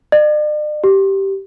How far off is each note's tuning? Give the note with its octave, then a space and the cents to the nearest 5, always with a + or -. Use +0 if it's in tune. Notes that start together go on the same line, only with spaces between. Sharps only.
D5 +45
G4 -10